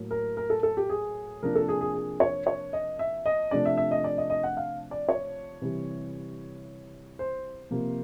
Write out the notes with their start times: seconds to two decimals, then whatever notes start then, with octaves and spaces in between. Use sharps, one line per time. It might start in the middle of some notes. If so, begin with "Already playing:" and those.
Already playing: A2 F#3 A#3
0.11 A#4
0.37 A#4
0.50 A4
0.63 A4
0.77 G4
0.89 G#4
1.42 C3 F3 A#3 D4 A#4
1.55 A4
1.69 G#4
1.81 G#4
1.94 G#4
2.20 C#5
2.47 C#5
2.73 D#5
2.99 E5
3.26 D#5
3.51 C3 F3 A3 D4 D5
3.65 E5
3.77 E5
3.91 D#5
4.04 D5
4.18 D#5
4.30 D#5
4.43 F#5
4.57 F5
4.91 D5
5.09 C#5
5.61 C3 E3 G3
7.19 C5
7.71 C3 F3 A#3